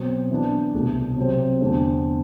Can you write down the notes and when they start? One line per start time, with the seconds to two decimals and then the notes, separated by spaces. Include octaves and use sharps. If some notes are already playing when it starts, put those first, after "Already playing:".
Already playing: B2 F#3 C4
0.31 E3 B3 D4
0.74 C2 B2 A3
1.16 C3 F#3 C4 G4
1.61 E2 D3 A3 C4